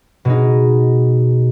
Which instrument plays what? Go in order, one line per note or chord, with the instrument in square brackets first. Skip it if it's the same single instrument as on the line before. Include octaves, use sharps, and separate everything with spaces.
[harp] B2 G#3 D#4